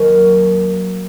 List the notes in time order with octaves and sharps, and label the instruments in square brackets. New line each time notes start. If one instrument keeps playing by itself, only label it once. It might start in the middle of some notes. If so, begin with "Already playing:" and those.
Already playing: [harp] D#2 D#3 F#3 A#3 C4 D#4